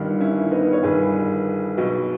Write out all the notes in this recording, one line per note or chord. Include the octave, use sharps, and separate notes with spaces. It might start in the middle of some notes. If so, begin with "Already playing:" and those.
Already playing: G1 G2 D#3
C#4 E4
B3 D#4
C#5
G1 G2 D#3 G#4 B4
B1 B2